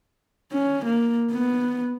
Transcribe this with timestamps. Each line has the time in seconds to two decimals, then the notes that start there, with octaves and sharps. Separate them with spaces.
0.52 C#4
0.86 A#3
1.32 B3